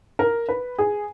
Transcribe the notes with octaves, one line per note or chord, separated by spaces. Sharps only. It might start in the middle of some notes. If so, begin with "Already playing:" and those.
A#4
B4
G#4